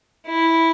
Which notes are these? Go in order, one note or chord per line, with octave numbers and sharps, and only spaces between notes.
E4